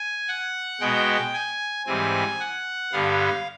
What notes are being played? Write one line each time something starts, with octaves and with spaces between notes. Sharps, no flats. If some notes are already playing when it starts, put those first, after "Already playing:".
Already playing: G#5
F#5
B2 G#3 B3 G5
G#5
G#2 E3 G3 C4 G#5
F#5
G2 D3 G3 B3 F5